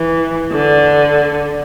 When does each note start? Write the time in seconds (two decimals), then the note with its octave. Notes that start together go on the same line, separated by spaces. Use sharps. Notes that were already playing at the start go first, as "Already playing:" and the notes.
Already playing: E3
0.53 D3